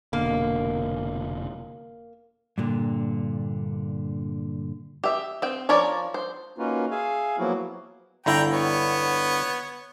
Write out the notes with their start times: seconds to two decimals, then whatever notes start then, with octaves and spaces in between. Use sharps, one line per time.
0.13 F1 B2 D3 A#3
2.58 G2 A#2 D3
5.04 G4 E5
5.42 C4 G5
5.69 F3 A#4 C#5 D5
6.14 C5
6.58 A#3 C#4 D#4 F4 F#4 B4
6.91 G#4 E5 F5 G#5
7.38 F3 F#3 A#3 B3 E4 F#4
8.26 G1 D3 E4 G5 A#5
8.51 B3 C#5